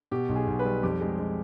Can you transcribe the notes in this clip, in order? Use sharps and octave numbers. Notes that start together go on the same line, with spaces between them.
B2 G4
B1
G#4
B1
B4
G3
F2 G4
G#3
G#3